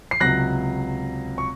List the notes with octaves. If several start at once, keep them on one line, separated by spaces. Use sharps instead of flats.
C7
C#2 C3 F#3 F#6 A#6
C#6